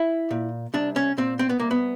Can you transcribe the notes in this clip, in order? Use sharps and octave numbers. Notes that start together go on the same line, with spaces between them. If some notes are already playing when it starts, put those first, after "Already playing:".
Already playing: E4
A#2
C2 D4
C#4
A#2 C4
C4
B3
C2 A#3
B3